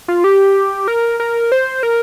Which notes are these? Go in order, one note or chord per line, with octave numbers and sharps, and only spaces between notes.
F4
G4
A#4
A#4
C5
A#4